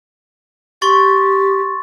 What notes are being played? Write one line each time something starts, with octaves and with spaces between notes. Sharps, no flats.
G4 C6 C#6 A6